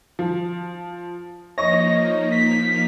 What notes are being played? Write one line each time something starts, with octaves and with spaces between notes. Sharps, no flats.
F3
F3 A#3 D#4 C#5 D#5 C#6 A#6
B6